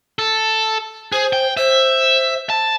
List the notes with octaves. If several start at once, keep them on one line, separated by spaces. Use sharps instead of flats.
A4
G#4 C5
G5
C5 E5
A5